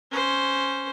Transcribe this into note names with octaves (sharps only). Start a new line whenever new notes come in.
C#4 C5